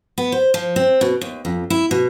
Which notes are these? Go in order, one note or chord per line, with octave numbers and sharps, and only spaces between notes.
B3
C5
F3
C4
B2
D#2
F2
E4
B2